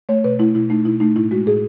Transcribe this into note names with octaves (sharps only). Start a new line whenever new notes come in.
A3 C#5
B2 B4
A3 E4
B2 E4
A3 D#4
B2 E4
A3 D#4
A2 E4
G#3 F#4
A2 G#4